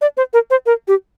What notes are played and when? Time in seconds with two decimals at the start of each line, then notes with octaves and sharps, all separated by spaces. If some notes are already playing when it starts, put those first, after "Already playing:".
0.01 D5
0.17 C5
0.33 A#4
0.50 C5
0.66 A#4
0.88 G4